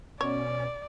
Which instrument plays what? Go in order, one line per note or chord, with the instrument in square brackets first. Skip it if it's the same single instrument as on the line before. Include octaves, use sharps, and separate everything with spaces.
[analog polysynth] B2 [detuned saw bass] C#4 [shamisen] C#5 [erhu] D5